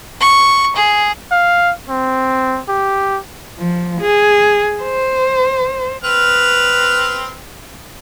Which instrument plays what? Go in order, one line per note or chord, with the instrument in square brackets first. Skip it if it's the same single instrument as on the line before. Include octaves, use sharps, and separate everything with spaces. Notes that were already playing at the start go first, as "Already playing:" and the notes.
[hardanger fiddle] C#6
G#4
[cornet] F5
C4
G4
[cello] F3
G#4
C5
[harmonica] C4 B4 F6